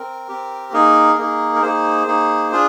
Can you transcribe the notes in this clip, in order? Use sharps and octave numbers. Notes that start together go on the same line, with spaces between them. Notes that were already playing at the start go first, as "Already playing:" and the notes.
Already playing: C4 A#4
C4 G4
A#3 D#4 G#4 A#4
A#3 D#4 G#4
A#4
A#3 D#4 G#4 C5
A#3 D#4 G#4
D4 F4 G#4